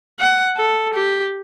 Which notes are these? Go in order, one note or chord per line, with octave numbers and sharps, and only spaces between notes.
F#5
A4
G4